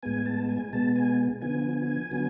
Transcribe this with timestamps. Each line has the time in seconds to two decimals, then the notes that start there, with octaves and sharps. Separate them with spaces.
0.03 A2 G#3 B3 G#5
0.26 A5
0.49 G#5
0.73 B2 G#3 B3 A5
0.96 G#5
1.42 D3 F3 B3 G#5
2.11 D3 F#3 B3